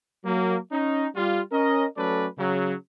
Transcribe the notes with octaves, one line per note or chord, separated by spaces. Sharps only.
F#3 A#3
C#4 D#4
G3 F4
C#4 A#4 D#5
F#3 A3 C#4 A4 B4 D5
C#3 F#3